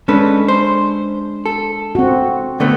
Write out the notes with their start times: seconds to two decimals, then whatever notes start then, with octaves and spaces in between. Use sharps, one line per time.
0.08 G#3 C#4 D4 A4 B4
0.48 C5
1.46 A4
1.95 C4 F#4
2.60 D3 A3 B3